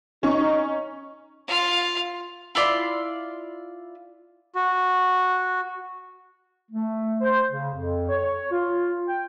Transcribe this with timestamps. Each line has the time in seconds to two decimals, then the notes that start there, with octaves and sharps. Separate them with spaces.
0.23 C#4 D#4 C#6
1.48 F4 F5
2.55 E4 F4 D5 C6
4.55 F#4
6.71 A3
7.21 C5
7.51 C#3
7.74 F2
8.09 C#5
8.52 F4
9.06 G5